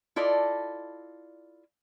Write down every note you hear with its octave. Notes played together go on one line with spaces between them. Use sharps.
E4 F4 A4 D5 D#5